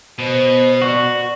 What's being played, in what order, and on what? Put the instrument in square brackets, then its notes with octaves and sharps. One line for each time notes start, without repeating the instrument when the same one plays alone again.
[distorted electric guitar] B2 [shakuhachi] C5
[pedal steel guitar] F#4 [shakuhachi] D5